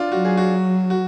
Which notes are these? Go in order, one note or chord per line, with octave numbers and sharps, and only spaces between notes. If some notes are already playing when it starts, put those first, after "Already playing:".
Already playing: D4 F4
F#3 F#4
G#4
F#4
F#4